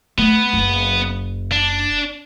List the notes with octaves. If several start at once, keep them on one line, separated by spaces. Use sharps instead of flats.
A3 B3
F#1
D4